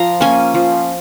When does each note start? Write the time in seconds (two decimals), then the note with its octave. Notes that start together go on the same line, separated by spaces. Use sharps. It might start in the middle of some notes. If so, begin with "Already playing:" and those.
Already playing: F3 A#5
0.20 A#3 C#4 G#5
0.54 F3